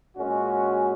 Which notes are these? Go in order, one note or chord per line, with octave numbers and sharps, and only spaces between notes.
A#2 G#3 C#4 F#4